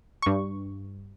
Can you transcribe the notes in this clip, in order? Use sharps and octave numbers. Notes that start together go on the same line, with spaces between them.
G2 C#6